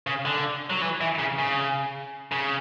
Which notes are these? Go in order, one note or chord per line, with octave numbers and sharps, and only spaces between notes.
C#3
D3
F#3
E3
E3
C#3
C#3
C#3